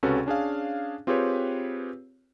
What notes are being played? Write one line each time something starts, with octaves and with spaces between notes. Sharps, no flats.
C#2 C3 C#4 F#4 A4 B4
C#4 D4 G#4 F5
C4 F4 G4 G#4 B4 C#5